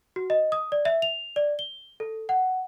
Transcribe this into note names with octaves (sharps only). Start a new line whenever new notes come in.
F#4
D#5
D#6
D5
E5
F7
D5
G7
A4
F#5